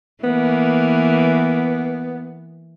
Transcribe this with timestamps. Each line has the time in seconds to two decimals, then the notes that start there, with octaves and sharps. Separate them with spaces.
0.23 E3 A#3 B3